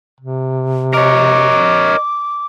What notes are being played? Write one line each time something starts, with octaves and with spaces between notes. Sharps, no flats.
C3
A#4 C#5 D#5 D6